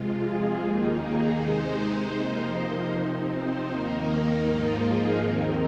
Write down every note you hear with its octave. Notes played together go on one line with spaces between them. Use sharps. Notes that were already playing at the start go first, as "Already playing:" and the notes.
Already playing: F2 C3 G#3 F4
G#4
D#2 D#3 A#3 D#4
G#4
C3 G#3 D#4 C5
F2 C3 F3 A#3 D#4 C5
D#5
C3 F3 C4 D#4
C5
D#2 D#3 A#3 D#4 A#4
G#2 F3 A#3 D#4 F4
G#4
D#2 D#3 C4 D#4 A#4